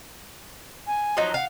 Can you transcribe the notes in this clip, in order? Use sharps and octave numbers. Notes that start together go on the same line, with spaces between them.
G#5
F3 F#3 D#4
F5 F#5